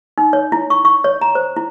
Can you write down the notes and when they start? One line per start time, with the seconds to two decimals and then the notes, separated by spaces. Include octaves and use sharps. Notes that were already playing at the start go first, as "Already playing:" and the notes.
0.18 D#4
0.33 C#5
0.52 E4
0.70 C#6
0.85 C#6
1.04 C#5
1.21 A#5
1.35 C5
1.57 E4